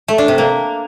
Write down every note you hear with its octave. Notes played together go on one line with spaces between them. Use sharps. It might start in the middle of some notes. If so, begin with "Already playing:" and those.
A3
D4
C3
A#3